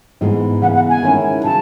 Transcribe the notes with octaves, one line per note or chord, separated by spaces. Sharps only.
G#2 E3 G#3 B3
C#3 E3 B3 F#5
F#5
G#5
D#3 G#3 C#4 E4
C#3 F#3 A5